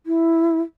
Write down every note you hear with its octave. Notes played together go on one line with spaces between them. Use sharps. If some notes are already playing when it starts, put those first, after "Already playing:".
E4